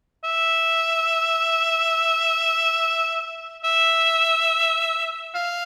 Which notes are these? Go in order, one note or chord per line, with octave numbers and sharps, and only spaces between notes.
E5
E5
F5